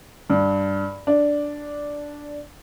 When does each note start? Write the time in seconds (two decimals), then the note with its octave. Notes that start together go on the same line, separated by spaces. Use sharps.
0.30 G2
1.07 D4